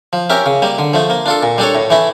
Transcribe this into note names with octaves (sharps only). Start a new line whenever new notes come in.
F3
C#4 G4 A#4 E5
C#3
G3 A#3
D3
F3 A3
A#3
D4 F4 A4
A#2
G3 D4 A4 C#5
A2
E3 A3 E4